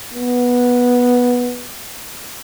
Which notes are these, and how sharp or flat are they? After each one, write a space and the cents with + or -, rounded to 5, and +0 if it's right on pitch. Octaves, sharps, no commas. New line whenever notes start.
B3 -10